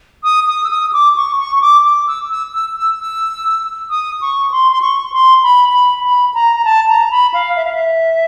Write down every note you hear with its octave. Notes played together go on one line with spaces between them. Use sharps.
D#6
D#6
E6
D#6
D6
C#6
C#6
C#6
D6
D6
E6
E6
E6
E6
E6
D#6
C#6
C6
C6
C#6
C6
B5
B5
B5
A#5
A#5
A5
A#5
B5
F5
E5
F5
E5